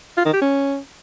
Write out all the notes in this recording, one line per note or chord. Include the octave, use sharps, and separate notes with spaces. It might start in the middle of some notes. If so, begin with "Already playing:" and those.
F4
D#3
G4
C#4